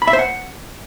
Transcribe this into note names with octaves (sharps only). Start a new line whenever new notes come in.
B5
E5
C5
F#5